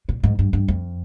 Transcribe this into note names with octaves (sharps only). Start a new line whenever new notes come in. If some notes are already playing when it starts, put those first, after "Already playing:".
A#2
G#2
G2
G2
F2